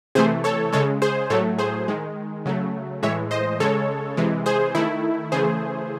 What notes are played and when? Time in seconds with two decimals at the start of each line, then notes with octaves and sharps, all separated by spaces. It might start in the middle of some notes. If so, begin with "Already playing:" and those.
0.15 C3 E3 A3 G#4 C5
0.44 A4 C#5
0.72 C#3 G#3 A4 C#5
1.02 G#4 C5
1.30 A2 F#3 A3 A4 C#5
1.59 G#4 C5
1.88 D#3 G#3
2.46 C#3 F#3 A3
3.03 A2 E3 G#3 C#5 E5
3.31 C5 D#5
3.60 C#3 G#3 A4 C#5
4.17 C3 E3 G#3
4.46 G#4 C5
4.75 D#3 A3 E4
5.32 C#3 E3 A3 G#4 C5